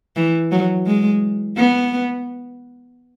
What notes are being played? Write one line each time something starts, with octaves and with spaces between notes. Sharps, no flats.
E3
F#3
G#3
B3